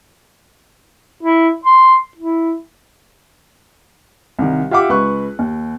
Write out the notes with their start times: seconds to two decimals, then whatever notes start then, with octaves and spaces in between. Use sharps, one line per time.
1.23 E4
1.65 C6
2.17 E4
4.39 C2 D#3
4.71 F4 G4 E5 F#5 D6
4.89 C#2 B4 C#6 F#6
5.39 D#2